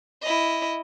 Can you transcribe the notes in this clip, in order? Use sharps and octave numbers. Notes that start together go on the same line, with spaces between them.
E4 D#5